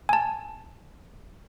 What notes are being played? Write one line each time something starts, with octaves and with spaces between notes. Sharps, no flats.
G#5 A5